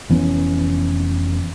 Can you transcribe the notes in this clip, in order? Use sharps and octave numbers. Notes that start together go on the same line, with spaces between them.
F1 E3 B3 C#4